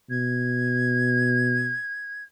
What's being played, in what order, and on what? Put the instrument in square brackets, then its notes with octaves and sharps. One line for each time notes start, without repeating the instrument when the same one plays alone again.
[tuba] B2 [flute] G#6